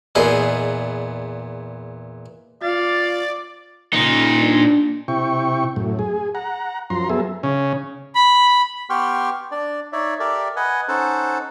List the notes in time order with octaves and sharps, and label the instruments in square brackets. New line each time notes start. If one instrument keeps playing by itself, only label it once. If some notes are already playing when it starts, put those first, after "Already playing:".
[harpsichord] E2 A#2 G#4 B4 D#5
[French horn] F4 [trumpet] D5 [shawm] F5 [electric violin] A6
[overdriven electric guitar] A#2 D#4 [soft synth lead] C#3
[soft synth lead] D4
[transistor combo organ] C3 E4 G5 C#6
F#2 A2
G#4
F#5 A#5
F#2 F3 A#5 C6
F#3 B3 G#4 A4 E5
C#3
[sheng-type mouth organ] B5
[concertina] B3 G4 G5 C6 C#6 F6
D4 D5
D#4 C#5 D5 E5
G4 A4 A#4 D5 E5
B4 D#5 F#5 G#5
C#4 D#4 A4 C5 F#5 A5